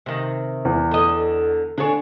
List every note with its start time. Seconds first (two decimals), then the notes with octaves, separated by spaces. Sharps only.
0.06 C3 D#3
0.65 E2
0.91 D3 D#5
1.78 D3 D4 G#4 C#5